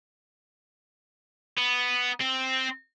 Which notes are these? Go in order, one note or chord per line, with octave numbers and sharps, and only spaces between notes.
B3
C4